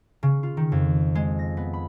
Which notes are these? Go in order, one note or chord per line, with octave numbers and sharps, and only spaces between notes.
C#3
F4
D#3
F2
G#3
A#6
B3
B5